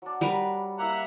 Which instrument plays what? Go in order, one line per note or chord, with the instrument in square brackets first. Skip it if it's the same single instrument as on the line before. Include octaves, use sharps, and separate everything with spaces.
[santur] F#3 D4
[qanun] G3 A#4 B4
[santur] A#3 E4 [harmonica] E5 F#5 A#5